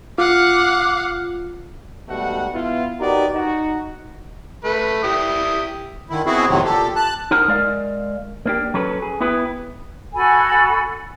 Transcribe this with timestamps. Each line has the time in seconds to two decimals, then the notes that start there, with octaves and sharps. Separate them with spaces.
0.18 F4 F5 F#5 D6
2.09 G#2 B2 G3 A3 F#4 F#5
2.54 B3 E4 F4
3.00 D#4 F#4 G4 A#4 B4 D5
3.34 D#4 F#4
4.65 A3 B4
5.03 E4 G4 D#6
6.10 D3 D#3 E4
6.26 B2 B3 C4 E4 F#4 G#4
6.48 F2 A2 C3 D#3 F#3 C4
6.64 A#2 G4 A4
6.96 A5 F#6
7.31 D#4 A#4 C5 F#5 A#5
7.48 G#3 A#4 D5 F5
8.46 A#3 D4 G4
8.74 F#3 C#4 A4 B4
9.02 G#4
9.20 B3 E4 G4 B4
10.14 F#4 A4 G#5 B5